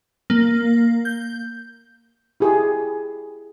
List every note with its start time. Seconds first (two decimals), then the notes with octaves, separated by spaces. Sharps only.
0.30 A#3
1.05 G6
2.40 E4 G4 G#4